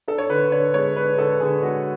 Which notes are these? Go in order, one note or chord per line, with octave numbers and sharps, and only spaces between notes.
D4 A4
C#5
D3 B4
D3 C#5
G#3 C#5
D4 B4
D3 A4
D3 G#4
G#3 F#4